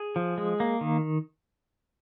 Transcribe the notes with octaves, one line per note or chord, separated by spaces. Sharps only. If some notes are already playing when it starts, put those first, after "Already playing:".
Already playing: G#4
F3
G#3
A#3
D#3